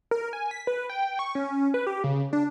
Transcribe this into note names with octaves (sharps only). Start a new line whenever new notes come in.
A#4
G#5
B6
B4
G5
C#6
C#4
B4
G4
C#3
D4